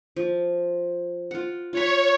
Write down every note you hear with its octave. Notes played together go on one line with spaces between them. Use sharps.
F3
F4 F#5
F4 C#5 F#5 B5